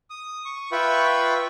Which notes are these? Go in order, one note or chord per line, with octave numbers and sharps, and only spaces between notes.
D#6
C#6
F4 B4 E5 G5 B5 C#6